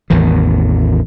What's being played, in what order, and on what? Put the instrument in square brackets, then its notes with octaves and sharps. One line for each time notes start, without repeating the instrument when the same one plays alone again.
[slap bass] A1 E2 D#3